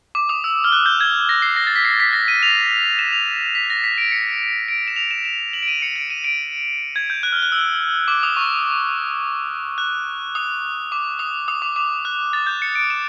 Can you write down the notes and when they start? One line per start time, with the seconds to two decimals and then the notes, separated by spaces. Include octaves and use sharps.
0.15 D6
0.29 D#6
0.44 E6
0.64 F6
0.73 F#6
0.86 G6
1.00 G#6
1.29 A#6
1.42 C7
1.56 A#6
1.67 A6
1.76 B6
1.85 C7
2.00 B6
2.13 A#6
2.28 D#7
2.43 F7
2.99 E7
3.12 F7
3.55 B6
3.70 A#6
3.84 B6
3.98 D7
4.12 C#7
4.68 D7
4.87 E7
4.96 F7
5.11 E7
5.25 E7
5.53 F#7
5.62 D7
5.68 D#7
5.82 C#7
5.96 D7
6.10 D#7
6.24 D7
6.96 G#6
7.10 G6
7.23 F#6
7.32 F6
7.43 F#6
7.52 E6
8.08 D6
8.23 D#6
8.37 C#6
9.78 F#6
10.35 D#6
10.92 D6
11.19 D#6
11.48 D#6
11.62 D6
11.76 D6
12.05 F#6
12.33 A6
12.47 G6
12.62 C#7
12.75 D7
12.90 E7